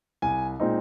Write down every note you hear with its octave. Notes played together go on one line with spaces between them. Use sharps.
C2 G#5
A#2 G#3 C4 D#4